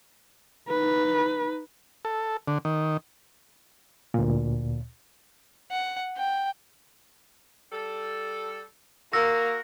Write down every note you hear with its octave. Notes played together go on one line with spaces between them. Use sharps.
D#4 B4
A4
D3
D#3
D2 A#2
F#5
G5
G3 A4
A#3 F#4 A#4 E6 A#6